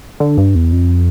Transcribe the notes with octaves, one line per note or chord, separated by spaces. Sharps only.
D3
G2
E2
F2